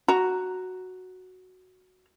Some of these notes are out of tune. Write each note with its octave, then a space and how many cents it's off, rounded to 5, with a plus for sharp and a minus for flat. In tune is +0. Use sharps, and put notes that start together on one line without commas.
F#4 +0 A#5 +0